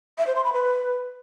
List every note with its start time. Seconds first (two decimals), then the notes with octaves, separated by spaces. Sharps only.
0.18 E5
0.27 C5
0.36 C6
0.44 B5
0.53 B4